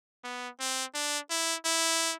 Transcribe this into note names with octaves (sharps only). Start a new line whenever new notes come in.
B3
C4
D4
E4
E4